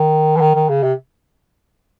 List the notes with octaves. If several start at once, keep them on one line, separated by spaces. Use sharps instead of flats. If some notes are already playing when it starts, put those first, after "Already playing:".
Already playing: D#3
E3
D#3
D#3
C#3
C3